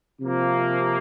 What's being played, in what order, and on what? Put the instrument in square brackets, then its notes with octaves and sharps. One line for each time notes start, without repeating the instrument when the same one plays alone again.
[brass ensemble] C3 F3 A#3